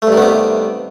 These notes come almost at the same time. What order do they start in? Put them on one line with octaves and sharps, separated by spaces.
A3 G2 D#3 B3 C3